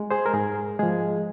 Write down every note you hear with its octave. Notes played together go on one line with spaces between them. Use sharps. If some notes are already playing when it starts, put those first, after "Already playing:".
Already playing: G#3
G#4 C5
A#4
G#2 G#4
F3 G#3 G#4